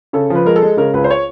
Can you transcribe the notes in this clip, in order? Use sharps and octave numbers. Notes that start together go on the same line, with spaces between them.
C#3 A4
F3 B4
G#3 A#4
A4
G#3
C#3 A#4
C#2 B4
C5
C#5